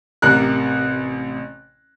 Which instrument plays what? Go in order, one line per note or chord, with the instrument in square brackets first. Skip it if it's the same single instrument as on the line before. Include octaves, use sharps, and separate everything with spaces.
[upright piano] A1 C3 A#4 F#6